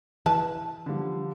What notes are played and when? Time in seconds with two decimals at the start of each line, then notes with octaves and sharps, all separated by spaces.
0.26 E3 B4 A5
0.86 D3 F3 G3